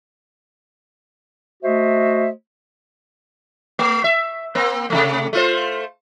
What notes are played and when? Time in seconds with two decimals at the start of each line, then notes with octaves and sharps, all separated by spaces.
1.63 A3 F#4 C5 D#5 E5
3.79 A3
4.04 E5
4.55 A#3 C4
4.90 C3 D#3 A3
5.33 A3 F4 C5